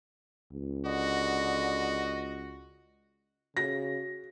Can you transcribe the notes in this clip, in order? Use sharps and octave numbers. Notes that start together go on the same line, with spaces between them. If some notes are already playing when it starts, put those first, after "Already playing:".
C#2
D3 F#4 D#5
C#3 F#4 A#6